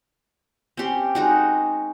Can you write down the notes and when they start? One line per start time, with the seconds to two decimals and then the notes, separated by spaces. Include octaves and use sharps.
0.77 C4 C#4 G4 C6
1.15 G#3 D#4 F#4